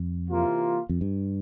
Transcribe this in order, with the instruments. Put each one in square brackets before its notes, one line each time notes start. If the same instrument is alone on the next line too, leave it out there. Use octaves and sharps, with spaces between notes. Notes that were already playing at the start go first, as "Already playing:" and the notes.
Already playing: [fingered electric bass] F2
[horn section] C3 E3 A#3 F4
[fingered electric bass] F2
G2